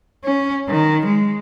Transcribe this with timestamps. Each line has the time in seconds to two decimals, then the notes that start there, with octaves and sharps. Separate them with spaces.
0.24 C#4
0.69 D#3
1.06 G#3